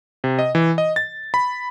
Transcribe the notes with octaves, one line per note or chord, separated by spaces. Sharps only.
C3
D#5
E3
D#5
A6
B5